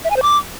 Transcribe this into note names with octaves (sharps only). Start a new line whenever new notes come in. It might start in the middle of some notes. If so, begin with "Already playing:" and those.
E5
G#5
C5
D6